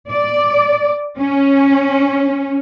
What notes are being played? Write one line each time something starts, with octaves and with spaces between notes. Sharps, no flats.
D5
C#4